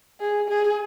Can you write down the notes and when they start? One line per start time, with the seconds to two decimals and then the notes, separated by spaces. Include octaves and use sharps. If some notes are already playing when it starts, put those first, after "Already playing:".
0.20 G#4
0.49 G#4